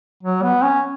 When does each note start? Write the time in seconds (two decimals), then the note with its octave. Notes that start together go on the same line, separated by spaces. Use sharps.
0.23 F#3
0.43 B3
0.63 C#4